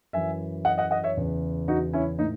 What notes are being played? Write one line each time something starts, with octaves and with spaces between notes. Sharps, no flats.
F#2 E3 E5 G#5
D#5 F#5
D#5 F#5
D#5 F#5
C#5 E5
E2 C#3 E3
D#4 F#4
C#4 E4
A2 D#4